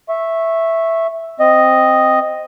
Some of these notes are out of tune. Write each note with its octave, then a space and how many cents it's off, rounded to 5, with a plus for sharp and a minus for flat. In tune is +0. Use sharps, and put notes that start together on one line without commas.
E5 +0 C#6 -15
C4 +0 D#5 +0